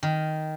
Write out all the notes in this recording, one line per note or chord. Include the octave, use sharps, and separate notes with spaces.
D#3